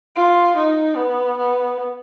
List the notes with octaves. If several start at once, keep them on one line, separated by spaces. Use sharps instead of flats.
F4
D#4
B3
B3